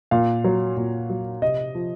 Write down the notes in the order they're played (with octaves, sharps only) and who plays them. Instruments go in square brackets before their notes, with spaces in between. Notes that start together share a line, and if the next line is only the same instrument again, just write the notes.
[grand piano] A#2 F5
F#3
A#2
F#3
C3 D#5
F3